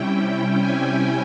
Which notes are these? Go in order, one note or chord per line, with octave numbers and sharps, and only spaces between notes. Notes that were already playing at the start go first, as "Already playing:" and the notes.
Already playing: C3 G3 C#4 E4 G5
G#5